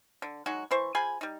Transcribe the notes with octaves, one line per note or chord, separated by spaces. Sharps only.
D3
F#3 G#3 D#4 F#4
E3 E4 C5 C#6
F3 G#4 G#5 B5
G3 D#4